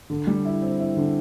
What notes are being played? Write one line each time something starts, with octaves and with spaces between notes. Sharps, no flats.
D3
G3
E4
C4
E4
D3